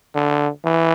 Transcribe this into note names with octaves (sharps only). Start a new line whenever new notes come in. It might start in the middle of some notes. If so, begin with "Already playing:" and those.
D3
E3